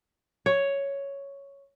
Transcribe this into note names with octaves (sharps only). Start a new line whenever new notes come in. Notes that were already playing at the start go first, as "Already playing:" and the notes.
C#5